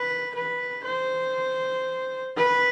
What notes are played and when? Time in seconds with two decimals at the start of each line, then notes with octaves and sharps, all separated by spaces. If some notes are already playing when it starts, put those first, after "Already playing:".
Already playing: B4
0.35 B4
0.85 C5
2.37 B4